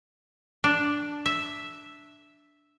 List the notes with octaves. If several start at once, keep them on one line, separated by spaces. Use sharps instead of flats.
D4
E5